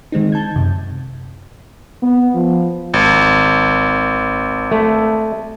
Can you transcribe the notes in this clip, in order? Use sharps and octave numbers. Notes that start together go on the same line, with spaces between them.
D#3 G#3 C4 D#4
A5 G6 G#6
F#2 C3
B3
F3
G#1
A3